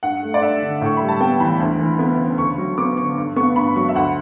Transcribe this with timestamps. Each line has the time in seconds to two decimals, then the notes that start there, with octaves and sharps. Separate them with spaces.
0.03 G2 F#5
0.23 A3
0.34 D5
0.41 G2 E5
0.62 D3
0.81 A2 C#6
0.97 G3 B5
1.09 A5
1.20 B3 G5
1.40 E3 B5
1.60 D2
1.79 E3
1.99 B3
2.19 C#3
2.38 D2 C#6
2.58 F#3
2.78 B3 D6
2.97 D3 C#6
3.18 G2
3.36 B3 C#6
3.56 G2 B5
3.76 F#3 C#6
3.89 E5
3.95 D2 F#5